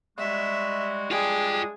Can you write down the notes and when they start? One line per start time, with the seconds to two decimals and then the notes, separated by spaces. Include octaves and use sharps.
0.18 G3 G#3 F#4 E5
1.11 G3 G#3 D4 F4 G#4 G5